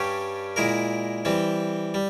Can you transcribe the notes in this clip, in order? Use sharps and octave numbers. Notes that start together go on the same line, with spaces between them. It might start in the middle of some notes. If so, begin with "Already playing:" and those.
Already playing: G2 G3 C#4 G4
A#2 G#3 E4 A#4
E3 G3 C4
G3